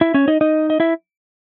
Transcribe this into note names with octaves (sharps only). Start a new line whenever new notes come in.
E4 E5
C#4 C#5
D#4 D#5
D#4 D#5
D#5
E4 E5